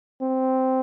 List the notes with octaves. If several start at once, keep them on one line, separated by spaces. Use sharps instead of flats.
C4